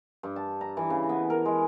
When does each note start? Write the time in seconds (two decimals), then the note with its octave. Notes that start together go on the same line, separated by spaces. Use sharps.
0.23 G2
0.36 A5
0.61 A#5
0.77 E3
0.90 C#3
1.09 B3
1.30 A#4
1.46 G#3